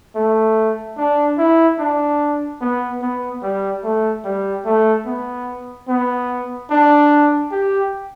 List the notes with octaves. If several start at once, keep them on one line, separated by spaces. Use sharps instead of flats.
A3
D4
E4
D4
B3
B3
G3
A3
G3
A3
B3
B3
D4
G4